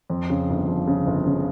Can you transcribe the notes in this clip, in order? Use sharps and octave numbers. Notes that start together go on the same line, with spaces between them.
F2
C#3
G1
F3
C#3
G1
C#3